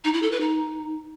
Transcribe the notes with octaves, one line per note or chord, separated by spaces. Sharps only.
D#4
E4
A4
B4
D#4